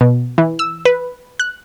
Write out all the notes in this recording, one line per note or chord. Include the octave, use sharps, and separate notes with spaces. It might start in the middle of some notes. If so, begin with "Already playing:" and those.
B2
E3
E6
B4
F#6